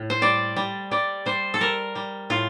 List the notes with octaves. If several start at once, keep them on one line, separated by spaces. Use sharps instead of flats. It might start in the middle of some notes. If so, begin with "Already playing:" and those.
Already playing: A2
C5
G3 D5
G3
G3 D5
G3 C5
A4
G3 A#4
G3
A2 F4